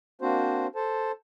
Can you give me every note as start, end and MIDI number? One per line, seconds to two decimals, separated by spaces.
0.21 0.67 58
0.21 0.67 60
0.21 0.67 62
0.21 0.67 66
0.21 0.67 72
0.75 1.12 69
0.75 1.12 72
0.75 1.12 81